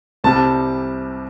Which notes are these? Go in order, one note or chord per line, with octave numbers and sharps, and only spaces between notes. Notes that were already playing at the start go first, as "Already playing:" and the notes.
C2 C3 G3 A5